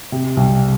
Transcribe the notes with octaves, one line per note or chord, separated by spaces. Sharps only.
C3
C2